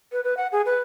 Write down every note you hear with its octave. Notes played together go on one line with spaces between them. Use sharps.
B4
B4
F#5
G#4
B4